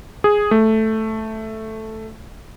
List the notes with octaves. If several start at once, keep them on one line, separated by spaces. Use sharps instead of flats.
G#4
A3